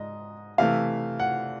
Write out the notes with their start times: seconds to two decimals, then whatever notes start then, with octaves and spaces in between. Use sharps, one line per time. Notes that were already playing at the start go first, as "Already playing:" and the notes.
Already playing: G#2 D#5
0.58 C3 E3 A3 F5
1.20 F#5